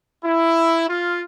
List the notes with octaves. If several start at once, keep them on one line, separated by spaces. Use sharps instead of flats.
E4
F4